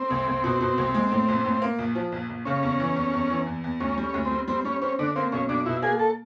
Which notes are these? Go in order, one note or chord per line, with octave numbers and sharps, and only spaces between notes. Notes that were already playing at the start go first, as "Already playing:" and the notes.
Already playing: C4
C2
C2
B2
B2
C2
G#3
A2
A#1
A2
A#3
A#1
F3
A#1
A#1
C#3 C#4
E2
E3
E2
E2
E3
E2
E2
D2 C#4
G3
C#4
D2
C4
G3
G3 C4
G3 C#4
C4 C#4
D3 D4
A#3 C4
B1 C#4
B1 D4
B2 E4
A#3 G#4
A4